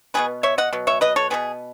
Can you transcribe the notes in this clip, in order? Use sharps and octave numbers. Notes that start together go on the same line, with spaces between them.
B2 F#3 B3 G#4 B4
C#5 E5
D#5 F#5
B2 F#3
C#5 E5
B4 D#5
A4 C#5
B2 F#3 B3 G#4